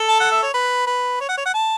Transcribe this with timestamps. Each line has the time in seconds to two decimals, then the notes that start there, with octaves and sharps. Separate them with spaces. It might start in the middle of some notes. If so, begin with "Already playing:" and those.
Already playing: A4
0.09 A5
0.20 F#5
0.31 E5
0.42 C#5
0.54 B4
0.87 B4
1.20 C#5
1.29 F#5
1.37 C#5
1.45 F#5
1.54 A5